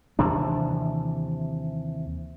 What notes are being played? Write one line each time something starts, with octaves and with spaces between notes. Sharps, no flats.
D#2 C3 E3 D4